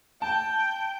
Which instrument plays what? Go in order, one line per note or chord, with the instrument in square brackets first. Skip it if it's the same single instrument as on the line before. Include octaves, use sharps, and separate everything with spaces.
[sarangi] G5 [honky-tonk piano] A5